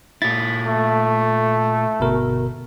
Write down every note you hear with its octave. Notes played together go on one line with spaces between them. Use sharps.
A#2 E4 A6
A3
G1 B2 A#4